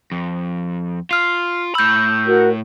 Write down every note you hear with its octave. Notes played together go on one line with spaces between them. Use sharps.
F2
F4 F6 C7
A2 B5 E6 G6
F#4 A#4